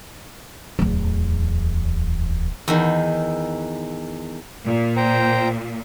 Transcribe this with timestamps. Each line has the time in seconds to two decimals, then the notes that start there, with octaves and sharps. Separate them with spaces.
0.79 D1 E2
2.68 E2 D#3
4.66 A#2
4.97 C5 G5 A#5